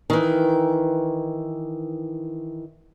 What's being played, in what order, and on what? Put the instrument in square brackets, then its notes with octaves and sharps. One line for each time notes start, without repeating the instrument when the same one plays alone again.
[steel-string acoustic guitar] D#3 E3